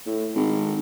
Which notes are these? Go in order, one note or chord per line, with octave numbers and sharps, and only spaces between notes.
A2
G#1